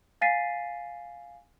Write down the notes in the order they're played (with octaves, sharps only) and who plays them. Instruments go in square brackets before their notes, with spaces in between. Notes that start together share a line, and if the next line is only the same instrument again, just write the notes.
[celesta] F5 G#5 A6 B6 C7 D#7